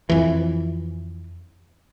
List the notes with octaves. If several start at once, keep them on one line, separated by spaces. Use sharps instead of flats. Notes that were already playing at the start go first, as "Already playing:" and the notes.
F2 E3